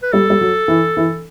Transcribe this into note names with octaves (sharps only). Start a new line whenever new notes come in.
B4
G3 A4
G3
F#3
E3
E3